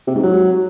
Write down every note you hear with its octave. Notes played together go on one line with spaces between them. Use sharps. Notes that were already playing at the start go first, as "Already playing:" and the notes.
C3
G#2
F#3